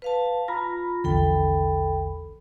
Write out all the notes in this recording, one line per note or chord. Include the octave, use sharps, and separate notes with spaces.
B4 F5 A5
F4 A#5 B5 A#6
A#1 E2 D3 A4 G5 B5